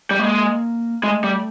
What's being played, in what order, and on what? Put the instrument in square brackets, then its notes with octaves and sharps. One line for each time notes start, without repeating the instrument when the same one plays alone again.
[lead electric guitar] G3
[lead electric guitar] G#3 [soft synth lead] A#3
[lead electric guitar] G#3 [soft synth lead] A3
[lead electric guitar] G3